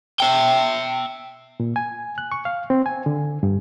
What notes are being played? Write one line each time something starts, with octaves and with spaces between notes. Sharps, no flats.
E5 G5
A#2
G#5
F#6
C#6
F5
C4
G#5
D3
G2